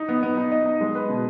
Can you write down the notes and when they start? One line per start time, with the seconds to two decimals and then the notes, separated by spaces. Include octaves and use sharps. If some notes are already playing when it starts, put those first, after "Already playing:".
Already playing: D#4
0.09 B3
0.23 B3
0.37 D#4
0.52 D#5
0.66 D#4
0.81 G#3
0.95 B4
1.09 B2